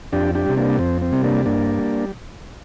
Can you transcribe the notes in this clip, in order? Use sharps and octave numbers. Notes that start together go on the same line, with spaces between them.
F2 D4 G4
D4 G4
C3 G3
A#3 D4
F2 C4
C4
C3 G3
A#3 D4
G2 A#3 D4
G3